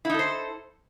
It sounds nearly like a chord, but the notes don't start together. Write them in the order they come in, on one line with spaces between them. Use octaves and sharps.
E4 D#4 A4 C5